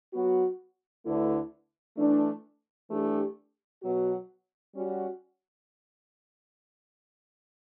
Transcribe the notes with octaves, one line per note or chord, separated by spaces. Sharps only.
F#3 B3 F#4
D2 D3 A3 E4 B4
E3 A3 D4
E3 A3 D4 G4
B2 F#3 B3 F#4
G3 C#4 F#4